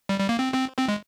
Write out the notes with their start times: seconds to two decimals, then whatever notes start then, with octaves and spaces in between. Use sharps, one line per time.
0.09 G3
0.19 G3
0.29 A#3
0.39 C4
0.54 C4
0.78 C4
0.88 G#3